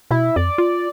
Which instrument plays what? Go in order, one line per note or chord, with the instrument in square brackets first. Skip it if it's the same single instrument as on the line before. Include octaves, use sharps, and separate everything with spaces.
[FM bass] B2 [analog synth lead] E4
[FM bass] F2 [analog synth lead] D5
[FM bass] F4